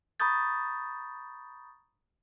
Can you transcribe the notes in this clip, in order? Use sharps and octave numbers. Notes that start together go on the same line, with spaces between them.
A#5 B5 C#6 D#6 G6 A6